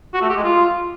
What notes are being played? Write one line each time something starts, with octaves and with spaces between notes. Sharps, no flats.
F#4
A3
G4
G#3
F4